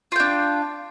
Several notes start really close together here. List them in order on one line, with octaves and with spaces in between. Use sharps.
F4 G5 D4